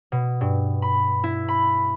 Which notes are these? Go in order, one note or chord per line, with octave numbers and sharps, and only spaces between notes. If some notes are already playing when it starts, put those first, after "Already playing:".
B2
G2
B5
E4
B5